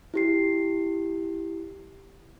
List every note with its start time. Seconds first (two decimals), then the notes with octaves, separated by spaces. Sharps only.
0.14 E4 G4 C7